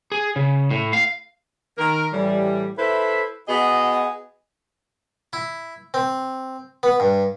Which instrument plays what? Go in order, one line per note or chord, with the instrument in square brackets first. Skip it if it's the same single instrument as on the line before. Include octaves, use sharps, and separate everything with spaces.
[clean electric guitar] G#4
C#3
A2
F5
[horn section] D#3 A#4
A2 E3 G3
E4 A4 B4 C5 E5
B3 F#4 G#4 D#5
[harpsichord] E4
C4
B3
G2